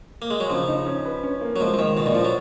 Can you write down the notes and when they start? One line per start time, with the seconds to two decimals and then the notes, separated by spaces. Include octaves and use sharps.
0.22 A#3
0.30 G#3
0.40 F#3
0.50 C#3 F3
0.68 D#4
0.86 C#4
1.05 B4
1.23 C#4
1.41 A#3
1.56 F#3
1.60 F3 G#3
1.74 F3
1.79 D#3 G#3
1.97 B2 F4
2.06 A#2
2.14 F3 F4
2.25 F#3